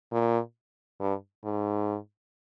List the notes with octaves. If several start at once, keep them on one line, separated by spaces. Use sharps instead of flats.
A#2
G2
G#2